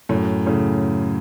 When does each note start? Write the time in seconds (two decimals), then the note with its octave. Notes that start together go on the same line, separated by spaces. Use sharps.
0.09 F#2 A2
0.47 A2 C#3